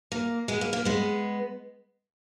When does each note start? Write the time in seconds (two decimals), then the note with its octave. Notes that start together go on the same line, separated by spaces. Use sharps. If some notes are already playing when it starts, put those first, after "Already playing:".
0.12 A#3
0.48 G#3 B3
0.61 A#3
0.73 A#3
0.85 G#3 B3